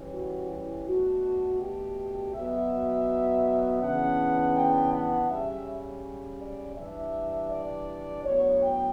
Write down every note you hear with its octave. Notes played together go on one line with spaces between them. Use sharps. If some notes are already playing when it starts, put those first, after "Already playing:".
Already playing: E3 G3 C#4
F#4
E4
B2 A3 D4 F#4
G4
B2 F#3 B3 E5
C#3 E3 B3 D4 F#5
G5
F#5
C#3 G3 C#4 E5
D5
E3 G3 D4 E5
D5
A2 F#3 B3 D4 C#5
G5